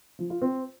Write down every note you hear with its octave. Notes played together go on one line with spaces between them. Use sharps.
F3
F4
C4